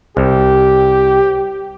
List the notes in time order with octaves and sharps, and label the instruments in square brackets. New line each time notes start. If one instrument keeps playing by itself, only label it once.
[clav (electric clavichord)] C2 [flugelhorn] G4